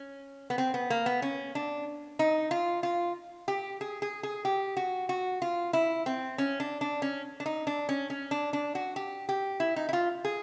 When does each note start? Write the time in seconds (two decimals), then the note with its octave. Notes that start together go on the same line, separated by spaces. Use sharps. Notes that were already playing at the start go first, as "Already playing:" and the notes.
Already playing: C#4
0.50 B3
0.58 C4
0.74 B3
0.90 A#3
1.06 B3
1.22 C#4
1.55 D4
2.19 D#4
2.51 F4
2.83 F4
3.48 G4
3.81 G#4
4.02 G#4
4.23 G#4
4.45 G4
4.77 F#4
5.09 F#4
5.42 F4
5.73 E4
6.06 C4
6.38 C#4
6.60 D4
6.81 D4
7.02 C#4
7.40 D4
7.46 D#4
7.67 D4
7.89 C#4
8.10 C#4
8.31 D4
8.53 D4
8.75 F#4
8.96 G4
9.29 G4
9.60 E4
9.76 D#4
9.89 E4
9.93 F4
10.25 G#4